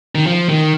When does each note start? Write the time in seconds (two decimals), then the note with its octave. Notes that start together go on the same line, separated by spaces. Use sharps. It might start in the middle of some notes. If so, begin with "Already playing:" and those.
0.15 D#3
0.26 F3
0.49 D#3